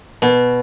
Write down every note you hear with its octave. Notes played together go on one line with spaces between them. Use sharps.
B2